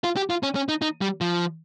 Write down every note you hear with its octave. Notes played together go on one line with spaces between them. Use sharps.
F4
G4
F4
C#4
C#4
D#4
D#4
G3
F3